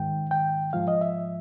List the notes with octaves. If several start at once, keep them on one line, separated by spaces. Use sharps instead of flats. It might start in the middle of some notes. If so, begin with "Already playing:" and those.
Already playing: G#2 D#3 G5
G5
G#2 F3 F5
D#5
E5